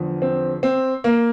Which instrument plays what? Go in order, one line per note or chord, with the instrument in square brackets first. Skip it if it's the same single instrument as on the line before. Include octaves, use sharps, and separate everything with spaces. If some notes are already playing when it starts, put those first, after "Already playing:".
Already playing: [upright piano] E2 D3 F3
C4
C4
A#3